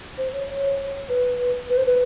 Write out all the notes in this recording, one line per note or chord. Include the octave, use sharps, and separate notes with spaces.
C5
C#5
C#5
B4
B4
C5
B4